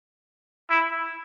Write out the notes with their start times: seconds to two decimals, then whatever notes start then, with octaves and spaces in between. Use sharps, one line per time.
0.69 E4